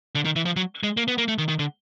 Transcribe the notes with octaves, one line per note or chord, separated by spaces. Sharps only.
D3
D#3
E3
F3
F#3
G#3
A#3
B3
A#3
A3
D#3
D#3
D3